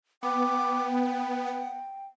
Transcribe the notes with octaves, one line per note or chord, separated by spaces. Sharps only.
B3 G5 D6
F#5